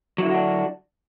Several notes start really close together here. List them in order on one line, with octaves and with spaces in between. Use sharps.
F#3 E4 D3 F#4 D4